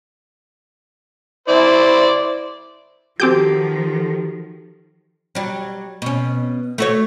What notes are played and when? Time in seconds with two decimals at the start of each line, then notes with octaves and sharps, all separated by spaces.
1.48 E4 C5 D5
3.20 D#3 F3 C4 F#4 G4 A4 D6 G6
5.35 F#3 G3
6.02 B2 C#4
6.78 A3 F#4 C#5